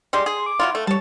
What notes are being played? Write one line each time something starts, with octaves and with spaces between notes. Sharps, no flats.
G3 G#3 G4 C6
G#4
D6
F#3 E4 F4
A3
G3 C#5 A5